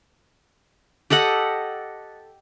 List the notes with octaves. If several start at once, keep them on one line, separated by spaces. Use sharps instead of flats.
G4 A4 D#5 F#5